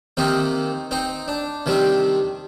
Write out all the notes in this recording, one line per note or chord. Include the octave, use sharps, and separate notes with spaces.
C3 D#3 A#3 C4 D#4
C4 D#4
D4
C3 D#3 G3 C4